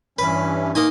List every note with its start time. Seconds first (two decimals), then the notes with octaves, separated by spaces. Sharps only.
0.19 G2 E3 C#4 B4
0.75 A#3 D#4 D#5 G#5